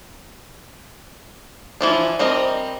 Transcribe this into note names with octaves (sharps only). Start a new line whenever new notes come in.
E3 F3 D4
G3 C4 A#4 D#5